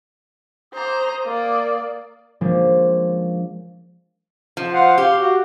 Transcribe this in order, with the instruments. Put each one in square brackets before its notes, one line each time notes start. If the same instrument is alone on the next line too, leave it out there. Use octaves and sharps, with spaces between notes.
[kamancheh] C5 A#5 [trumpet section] D6 D#6
[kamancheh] A#3 D5
[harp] F3 G#3 A#3 C#4 D4
[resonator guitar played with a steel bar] F3
[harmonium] C5 F5 F#5
[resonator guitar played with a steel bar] G4 [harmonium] F5
[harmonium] F#4